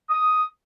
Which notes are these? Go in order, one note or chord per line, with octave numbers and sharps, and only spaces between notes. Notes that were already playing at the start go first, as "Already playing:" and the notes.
D#6